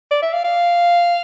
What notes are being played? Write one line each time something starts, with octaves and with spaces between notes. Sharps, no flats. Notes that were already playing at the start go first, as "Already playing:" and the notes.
D5
E5
F5
F5